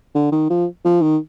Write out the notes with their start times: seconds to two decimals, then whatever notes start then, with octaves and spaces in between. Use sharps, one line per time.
0.15 D3
0.32 D#3
0.50 F3
0.85 F3
1.02 D#3